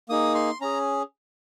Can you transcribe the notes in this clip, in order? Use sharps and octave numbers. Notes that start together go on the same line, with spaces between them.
A#3 D#4 G#4 D#6
C6
C#4 G#4 A#5